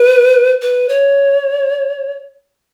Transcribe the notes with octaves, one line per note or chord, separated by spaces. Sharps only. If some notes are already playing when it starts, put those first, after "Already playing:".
Already playing: B4
B4
C#5